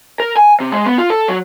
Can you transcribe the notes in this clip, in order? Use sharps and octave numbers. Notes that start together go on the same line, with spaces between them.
A#4
G#5
C3
G#3
B3
F4
A4
F#3